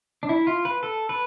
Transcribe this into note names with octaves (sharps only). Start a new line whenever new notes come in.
D4
E4
F4
B4
A4
B4